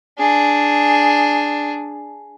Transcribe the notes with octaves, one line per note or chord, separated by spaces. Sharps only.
D4 G#4